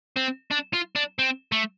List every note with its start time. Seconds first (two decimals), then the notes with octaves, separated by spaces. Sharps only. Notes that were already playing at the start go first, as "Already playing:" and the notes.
0.17 C4
0.51 D4
0.74 F4
0.96 D4
1.19 C4
1.52 A3